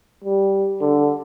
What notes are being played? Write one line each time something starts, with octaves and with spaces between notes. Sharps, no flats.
G3
D3